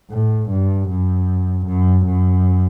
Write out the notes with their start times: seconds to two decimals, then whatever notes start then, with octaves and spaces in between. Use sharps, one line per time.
0.10 A2
0.49 G2
0.89 F#2
1.66 F#2
2.06 F#2